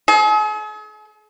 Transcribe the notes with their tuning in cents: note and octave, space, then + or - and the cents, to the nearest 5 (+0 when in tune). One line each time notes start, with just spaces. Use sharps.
G#4 +45